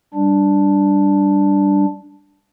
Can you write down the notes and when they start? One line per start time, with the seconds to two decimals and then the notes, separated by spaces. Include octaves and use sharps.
0.14 G3 D4